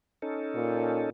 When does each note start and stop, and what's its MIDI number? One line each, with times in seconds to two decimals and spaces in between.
0.22 1.10 61
0.22 1.10 63
0.22 1.10 69
0.55 1.08 46